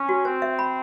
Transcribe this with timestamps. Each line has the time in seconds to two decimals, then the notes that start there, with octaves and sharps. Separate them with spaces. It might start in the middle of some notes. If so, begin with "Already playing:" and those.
Already playing: C#4
0.09 F#4
0.25 C4 C5
0.42 E5
0.59 B5